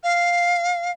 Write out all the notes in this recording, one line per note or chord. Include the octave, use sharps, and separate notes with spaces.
F5